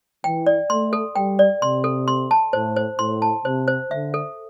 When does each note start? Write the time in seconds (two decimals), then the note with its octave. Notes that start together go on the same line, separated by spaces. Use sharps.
0.24 E3 G5
0.46 D5
0.70 A3 C6
0.93 A4
1.16 G3 G5
1.39 D5
1.62 C3 C6
1.84 A4
2.08 C6
2.31 A5
2.53 A2 C5
2.76 C5
2.99 A2 C6
3.22 A5
3.44 C3 C5
3.68 C5
3.90 D3 E5
4.14 A4